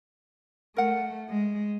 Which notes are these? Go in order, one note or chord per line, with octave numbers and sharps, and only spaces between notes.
A3 A#4 F#5
G#3